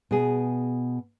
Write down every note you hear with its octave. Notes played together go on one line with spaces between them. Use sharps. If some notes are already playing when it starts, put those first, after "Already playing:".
B2 G#4